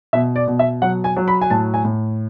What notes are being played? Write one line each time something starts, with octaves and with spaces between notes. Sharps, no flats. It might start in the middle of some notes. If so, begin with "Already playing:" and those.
B2 E5
D5
B2
E5
F#3 F#5
G#5
F#3
B5
G#5
A2 A5
G#5
A2